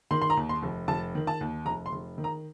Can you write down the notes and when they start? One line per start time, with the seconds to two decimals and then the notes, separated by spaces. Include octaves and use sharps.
0.11 D#3 C6
0.21 C6
0.30 A#5
0.37 D#2
0.49 C6
0.63 F1
0.88 F1 A5
1.15 D#3
1.27 A5
1.41 D#2
1.65 F1 A#5
1.86 C6
1.92 F1
2.18 D#3
2.24 A#5